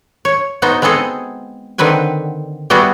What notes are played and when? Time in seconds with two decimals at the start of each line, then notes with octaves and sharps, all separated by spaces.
0.25 C#5
0.62 B3 D#4 F#4 C5
0.82 G#3 B3 C4 G#4 A4 D#5
1.78 D3 D#3 C4 B4 G#5
2.70 G3 B3 E4 F#4 G#4